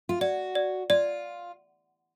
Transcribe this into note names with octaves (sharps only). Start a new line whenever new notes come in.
F4
F#4 D5
D5
F4 D5